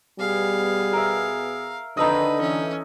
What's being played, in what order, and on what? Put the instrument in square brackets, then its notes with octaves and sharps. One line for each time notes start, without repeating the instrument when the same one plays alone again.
[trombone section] B2 B3 G#4 [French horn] G3 [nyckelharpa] F5
[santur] A#4 E5
[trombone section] F2 D#3 [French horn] D3 [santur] D#4 A4 D#5 [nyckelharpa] B4
[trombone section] E3 [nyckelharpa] C#4